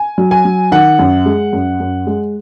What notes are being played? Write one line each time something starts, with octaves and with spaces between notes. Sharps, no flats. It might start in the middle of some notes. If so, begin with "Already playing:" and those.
Already playing: G#5
F#3
G#5
F#3
D#3 F#5
F#2
G#3
F#2
F#2
G#3